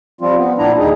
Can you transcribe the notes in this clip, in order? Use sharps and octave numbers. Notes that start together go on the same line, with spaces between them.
F3 G3 C4 F4
B3
A#2 G3 D4 E4 A#5
D#2 G3 D#4 G#4